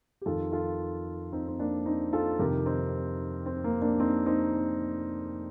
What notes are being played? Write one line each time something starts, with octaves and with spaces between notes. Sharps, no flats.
G4
F2 D#3 F4 A4
F4 A4
C4 D#4
C4
A#3 D4
C4 D#4
F4 A4
F2 C3 D#3 G4 A#4
C4 D#4
C4
A#3
A#3 D4
C4 D#4
C4 D#4